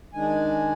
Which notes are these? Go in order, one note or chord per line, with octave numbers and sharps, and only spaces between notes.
D#3 G#3 D4 G#5